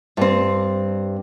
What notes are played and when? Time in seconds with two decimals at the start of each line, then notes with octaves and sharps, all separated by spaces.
0.17 G2 C4